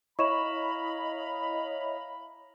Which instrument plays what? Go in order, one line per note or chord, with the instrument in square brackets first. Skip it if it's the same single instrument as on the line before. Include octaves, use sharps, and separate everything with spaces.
[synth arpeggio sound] E4 C#5 D#5 [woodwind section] F5 A#5 B5 [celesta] C#6 E7